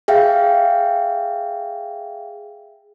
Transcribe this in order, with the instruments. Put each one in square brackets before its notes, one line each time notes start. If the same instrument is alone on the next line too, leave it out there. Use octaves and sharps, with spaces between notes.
[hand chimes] G#4 E5 F5 G5